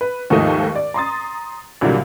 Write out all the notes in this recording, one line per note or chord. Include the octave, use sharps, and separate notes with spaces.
B4
D#2 G#2 F3 A3 D#4
D5
A#5 C6 D#6 A6
C2 A#2 D3 F#3 G3 A#3